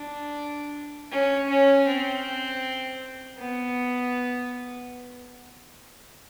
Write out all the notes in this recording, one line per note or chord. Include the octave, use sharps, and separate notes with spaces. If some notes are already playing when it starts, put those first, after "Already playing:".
Already playing: D4
C#4
C#4
C4
B3